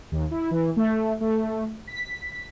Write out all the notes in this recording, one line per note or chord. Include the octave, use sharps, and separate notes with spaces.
D#2
E4
E3
A3
A3
B6